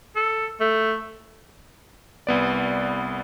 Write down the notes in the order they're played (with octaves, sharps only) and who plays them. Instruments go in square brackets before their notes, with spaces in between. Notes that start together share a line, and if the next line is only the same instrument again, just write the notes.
[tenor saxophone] A4
A3
[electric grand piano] C2 B3 D5